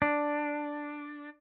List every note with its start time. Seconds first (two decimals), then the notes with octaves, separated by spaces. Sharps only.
0.02 D4